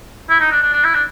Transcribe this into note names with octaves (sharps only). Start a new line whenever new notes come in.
E4
D#4
D4
D4
D4
E4
D4